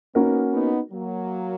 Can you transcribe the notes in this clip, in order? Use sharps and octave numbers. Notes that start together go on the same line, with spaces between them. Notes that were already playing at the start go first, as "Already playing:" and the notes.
A#3 B3 C#4 D#4 F#4 A#4
B3 D#4
F#3 A#3